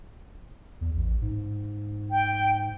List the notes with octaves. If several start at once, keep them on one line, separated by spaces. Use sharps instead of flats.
E2
A1
G#2
G5